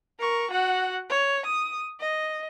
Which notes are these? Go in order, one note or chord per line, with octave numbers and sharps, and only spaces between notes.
A#4 C#6
F#4 F#5
C#5
D#6
D#5